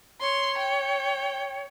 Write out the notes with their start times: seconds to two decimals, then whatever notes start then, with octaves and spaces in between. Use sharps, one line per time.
0.21 C#5 C6
0.58 G5